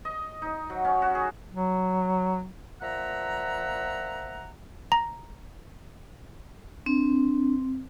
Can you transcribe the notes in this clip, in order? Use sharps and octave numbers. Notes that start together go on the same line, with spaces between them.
D#5
D#4
F#3
C#4
F#4
G#4
F#3
A#2 F3 E5 F#5 A#5
A#5
C4 D4